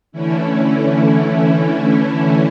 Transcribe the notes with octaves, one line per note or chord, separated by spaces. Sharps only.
D3 E3 A3 C#4 E4